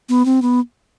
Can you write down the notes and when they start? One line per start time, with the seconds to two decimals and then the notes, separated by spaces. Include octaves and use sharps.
0.09 B3
0.25 C4
0.42 B3